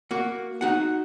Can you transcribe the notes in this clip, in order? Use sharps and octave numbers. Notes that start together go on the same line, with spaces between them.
A#3 F#4
D#4 F#4 F#5